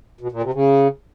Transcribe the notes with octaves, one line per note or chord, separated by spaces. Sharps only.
B2
A#2
C3
C#3